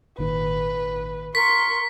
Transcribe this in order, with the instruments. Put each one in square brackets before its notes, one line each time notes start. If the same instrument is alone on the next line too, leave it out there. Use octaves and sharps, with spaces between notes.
[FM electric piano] G#1 A#2 D#3 [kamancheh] B4
[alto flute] A#4 [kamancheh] C6 C#6 [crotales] B6